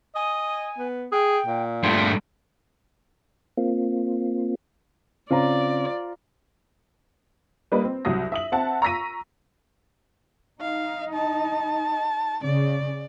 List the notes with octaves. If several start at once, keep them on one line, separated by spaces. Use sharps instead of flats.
D#5 G#5
B3
G#4 G5
A#2
G2 A3 C6
A#3 C4 F4
C#3 C4 C#4 F4 C5 D5 A#5
G3 A#3 B4 D#5
C4
C2 F#3 D#6 A#6
E5 D#6 F#7
C4 E5 F#5 A5
A#5 C#6 E6 A#6 B6 D#7
D#4 F5
A5
C#3 D5